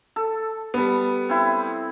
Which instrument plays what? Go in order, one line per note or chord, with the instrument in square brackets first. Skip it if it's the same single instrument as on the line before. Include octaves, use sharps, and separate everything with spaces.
[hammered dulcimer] A4
[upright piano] G3 B3
[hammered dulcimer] C4 E4